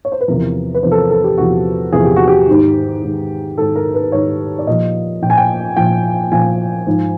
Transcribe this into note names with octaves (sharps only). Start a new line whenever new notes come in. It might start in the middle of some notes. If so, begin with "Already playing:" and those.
C#5
C5
B4
E2 C3 F3 A#4
B4
E2 C3 F3 C5
A4
A#4
A4
G4
E2 C3 F3 F#4
E2 C3 F3 G#4
G4
F#4
G4
G#2 D#3
G#2 D#3
G#2 D#3 A4
A#4
B4
G#2 D#3 C#5
D5
A#2 F3 D#5
A#2 F3 G5
G#5
G5
A#2 F3 G5
A#2 F3 G#5
G#2 F3